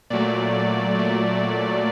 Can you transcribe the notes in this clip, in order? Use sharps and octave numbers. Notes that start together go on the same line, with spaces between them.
A#2 F#3 A3 D5
A#2 F#3 A3